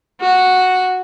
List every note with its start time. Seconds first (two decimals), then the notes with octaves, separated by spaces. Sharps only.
0.20 F#4